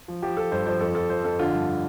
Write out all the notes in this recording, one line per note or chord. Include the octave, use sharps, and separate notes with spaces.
F3
F3 G4
F3 A4
G2 C5
F3 C5
F2 A4
F2 A4
F3 C5
F2 A4
D3 F4
G2